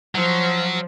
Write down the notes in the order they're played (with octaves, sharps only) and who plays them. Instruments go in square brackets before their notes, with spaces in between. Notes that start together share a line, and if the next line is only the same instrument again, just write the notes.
[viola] F3 [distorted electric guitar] F#3